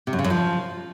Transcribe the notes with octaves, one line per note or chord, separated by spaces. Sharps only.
C3
F#2
C#3
F#2
F3